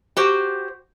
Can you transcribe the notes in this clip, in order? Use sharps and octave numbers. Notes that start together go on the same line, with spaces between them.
F#4 G4 C5